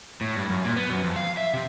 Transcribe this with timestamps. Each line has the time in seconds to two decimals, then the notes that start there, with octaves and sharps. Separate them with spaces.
0.21 A2
0.36 G2
0.50 F#2
0.65 A#2
0.76 B3
0.90 F#2
1.04 F2
1.16 F5
1.37 E5
1.54 C3